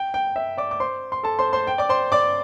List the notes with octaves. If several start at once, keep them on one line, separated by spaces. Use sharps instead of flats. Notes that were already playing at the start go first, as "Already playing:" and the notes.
Already playing: G5
G5
E5
D5 D6
D6
C5 C6
C6
A4 A5
C5 C6
C5 C6
G5
D5 D6
C5 C6
D5 D6